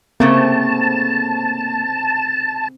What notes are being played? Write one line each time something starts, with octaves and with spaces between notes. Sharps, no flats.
G#2 C#3 A3 A#3 C4 A5